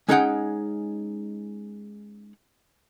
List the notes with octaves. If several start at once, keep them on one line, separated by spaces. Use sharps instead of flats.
G#3 C#4 D#4 G#4 F#5 G5